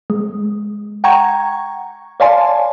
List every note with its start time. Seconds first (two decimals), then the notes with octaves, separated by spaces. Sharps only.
0.10 G#3
1.04 F#5 G5 A#5 C#6 G#6
2.20 C#5 D5 F5 G#5 A5 C6